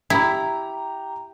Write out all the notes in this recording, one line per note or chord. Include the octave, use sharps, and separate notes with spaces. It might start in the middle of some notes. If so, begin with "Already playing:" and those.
E4 G4 A#5